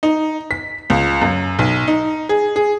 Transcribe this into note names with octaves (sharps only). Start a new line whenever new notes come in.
D#4
B6
C#2
F#2
B1
D#4
G#4
G#4